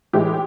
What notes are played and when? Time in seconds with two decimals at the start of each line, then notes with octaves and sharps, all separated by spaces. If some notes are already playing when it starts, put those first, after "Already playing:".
0.13 A2 E3 G#3 G4